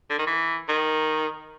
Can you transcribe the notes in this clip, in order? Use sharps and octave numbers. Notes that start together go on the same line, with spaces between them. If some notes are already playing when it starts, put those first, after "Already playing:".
D3
D#3
E3
D#3